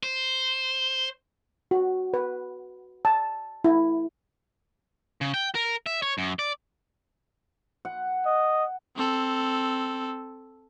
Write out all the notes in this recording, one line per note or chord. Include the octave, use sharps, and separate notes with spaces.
C5
F#4
B4
A5
E4
C#3
G5
A#4
E5
C#5
F#2
D5
F#5
D#5
C4 A4